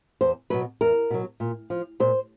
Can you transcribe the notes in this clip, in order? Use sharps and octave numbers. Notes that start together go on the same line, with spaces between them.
E2 C5
B2 F#3 B4
E2 A#4
B2 F#3
A#2
F3
A#2 C5